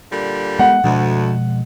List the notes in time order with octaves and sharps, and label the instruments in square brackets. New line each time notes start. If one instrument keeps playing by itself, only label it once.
[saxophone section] A#2 D3 G3
[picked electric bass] G#3 B3 [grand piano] F#5
[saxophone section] D2 [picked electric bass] B2 F3 G#3